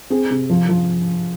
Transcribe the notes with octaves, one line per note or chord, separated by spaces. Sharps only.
C4 G#4
C3
F3
F3